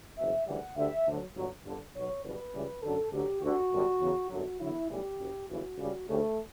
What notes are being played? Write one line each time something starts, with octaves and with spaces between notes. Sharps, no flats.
F#1 E2 B2 E5
D2 C#3 E3 G3 F#5
D2 D3 G3 E5
D2 D3 F#3
G1 G2 F#3
G1 G2 D3
B1 B2 F#3 C#5
F#1 E2 B2 G3 B4
C#2 C#3 E3 G3
F#2 D3 F#3 A4
D2 D3 F#3 G4
D2 D3 G3 F#4
G1 F#2 D3 G3
E2 C#3 F#3
G1 F#2 D3 F#3 F#4
E2 D3 F#3 E4
B1 A2 E3 G3 G4
F#1 F#2 C#3
G1 F#2 C#3 E3 F#4
C#2 C#3 G3
D2 C#3 G3 A3